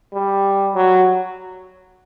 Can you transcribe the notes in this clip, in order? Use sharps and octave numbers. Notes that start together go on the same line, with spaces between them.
G3
F#3